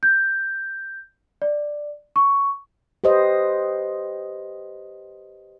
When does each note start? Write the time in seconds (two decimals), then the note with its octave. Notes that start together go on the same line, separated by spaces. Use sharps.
0.03 G6
1.42 D5
2.16 C#6
3.04 G4 B4 C5 D#5